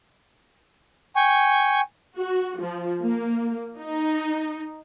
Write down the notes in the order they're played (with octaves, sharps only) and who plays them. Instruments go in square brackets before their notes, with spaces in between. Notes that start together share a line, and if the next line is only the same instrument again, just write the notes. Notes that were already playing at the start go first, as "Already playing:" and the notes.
[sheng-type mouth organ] G5 G#5 C#6
[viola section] F#4
F3
A#3
D#4